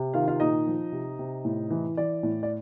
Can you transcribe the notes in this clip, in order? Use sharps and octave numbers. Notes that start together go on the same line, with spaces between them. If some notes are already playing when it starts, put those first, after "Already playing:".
Already playing: C3
D#3 F4 F5
F4 F5
A#2 D#4 D#5
F3
C3
C3
A2
E3
E3 D5
A2
D5